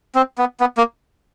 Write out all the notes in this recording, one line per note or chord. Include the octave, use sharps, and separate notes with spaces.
C4
B3
B3
A#3